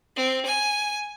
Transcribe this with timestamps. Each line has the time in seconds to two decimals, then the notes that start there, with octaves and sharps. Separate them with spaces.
0.16 C4
0.46 G#5